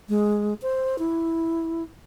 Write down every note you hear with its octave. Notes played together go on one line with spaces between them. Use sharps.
G#3
C5
E4